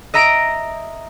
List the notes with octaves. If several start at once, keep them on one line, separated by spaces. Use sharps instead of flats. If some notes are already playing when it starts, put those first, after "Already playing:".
D#5 E5 A#5 A#6 D7